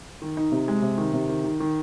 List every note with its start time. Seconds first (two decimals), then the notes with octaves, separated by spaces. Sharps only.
0.22 D#3
0.37 D#4
0.52 C3
0.68 G#3
0.82 C3
0.98 D#3
1.13 C3
1.29 D#3
1.44 D#3
1.60 D#3